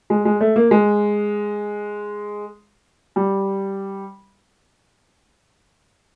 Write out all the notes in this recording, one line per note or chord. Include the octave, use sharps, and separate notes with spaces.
G#3
G#3
A3
A#3
G#3
G3